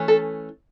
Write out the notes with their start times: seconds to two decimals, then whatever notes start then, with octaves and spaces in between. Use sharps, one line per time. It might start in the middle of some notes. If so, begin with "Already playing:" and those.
Already playing: E3 A3 C#4
0.08 A4